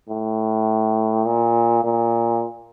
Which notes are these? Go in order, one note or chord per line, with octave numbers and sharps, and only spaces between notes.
A2
A#2
A#2